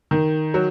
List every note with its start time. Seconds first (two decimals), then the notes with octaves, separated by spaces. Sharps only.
0.11 D#3
0.54 F#3